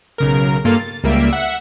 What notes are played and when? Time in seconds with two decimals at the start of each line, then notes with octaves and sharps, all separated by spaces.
0.18 B1 C#3 A#4
0.65 G2 A#3 F4 A4 F5 F6
0.80 A6
1.04 C#2 G3 A#3 E5 D7
1.30 E5 F#5